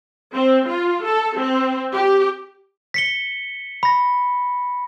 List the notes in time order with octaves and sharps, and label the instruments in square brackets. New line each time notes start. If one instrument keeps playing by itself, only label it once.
[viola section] C4
F4
A4
C4
G4
[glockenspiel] B6 C#7 G7
B5 A#6